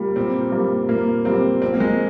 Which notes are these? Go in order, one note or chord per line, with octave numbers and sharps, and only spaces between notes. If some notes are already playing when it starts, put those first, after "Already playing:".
Already playing: A#2 G3 A#3
A#2 C4
G3 A#3
A#2 A#3
G3 A#3 C4
F3 C4
A#3
G#3